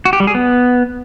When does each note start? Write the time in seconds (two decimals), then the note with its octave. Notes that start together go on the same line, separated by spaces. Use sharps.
0.05 F#4
0.13 G4
0.20 G3
0.27 G#4
0.35 B3